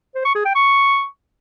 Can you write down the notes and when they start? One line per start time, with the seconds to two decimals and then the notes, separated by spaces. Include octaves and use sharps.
0.15 C5
0.25 C#6
0.35 G#4
0.45 G5
0.55 C#6